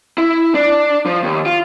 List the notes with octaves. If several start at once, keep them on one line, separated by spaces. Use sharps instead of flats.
E4
D4
F3
D#2
F4